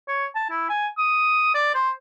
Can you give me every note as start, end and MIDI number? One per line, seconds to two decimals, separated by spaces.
0.08 0.25 73
0.35 0.48 81
0.50 0.66 64
0.69 0.87 80
0.98 1.52 87
1.55 1.70 74
1.74 1.90 72